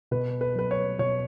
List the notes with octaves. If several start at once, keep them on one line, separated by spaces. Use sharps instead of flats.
B2 B4
B4
F#3 B4
C#5
B2 C#5